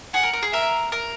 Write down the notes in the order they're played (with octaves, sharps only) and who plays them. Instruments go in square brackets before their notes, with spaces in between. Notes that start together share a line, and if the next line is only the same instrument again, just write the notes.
[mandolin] G#4 [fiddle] F#5
[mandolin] A#4
A#4
G#4
[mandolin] A#4 [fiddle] E5
[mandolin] A#4